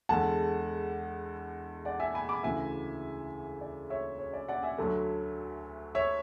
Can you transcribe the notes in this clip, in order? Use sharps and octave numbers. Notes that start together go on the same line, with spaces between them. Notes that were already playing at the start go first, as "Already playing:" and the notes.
E2 D3 G#3 F#5 A5
D5 F#5
E5 G#5
G#5 B5
B5 D6
D2 C#3 E3 E5 G#5
D5
C#5 E5
C#5
D5
D5 F#5
E5 G#5
D2 D3 F#3 A3
C#5 E5